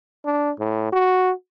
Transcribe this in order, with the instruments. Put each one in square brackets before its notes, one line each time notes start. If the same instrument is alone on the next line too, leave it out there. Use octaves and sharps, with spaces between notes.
[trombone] D4
A2
F#4